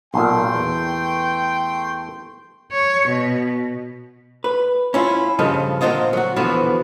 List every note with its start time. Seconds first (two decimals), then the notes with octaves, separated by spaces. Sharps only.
0.14 B1 A#2 A3 G5 C6
0.54 E2
2.72 C#5
3.08 B2
4.44 B4
4.94 C#4 E4 F4
5.39 G2 C#3 F3 A4 D#5
5.81 A#2 D3 C4 F4 D#5
6.13 F#3 F#4
6.36 E2 B2 D3 E3 F3 E4